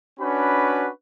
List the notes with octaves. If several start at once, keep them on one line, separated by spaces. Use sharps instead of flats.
C#4 D4 F#4 B4 B5